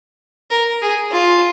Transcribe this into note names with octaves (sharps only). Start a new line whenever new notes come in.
A#4
G#4
F4